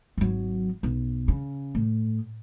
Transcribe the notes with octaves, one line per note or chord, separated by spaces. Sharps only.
G#1 F#3
B1
C#3
A2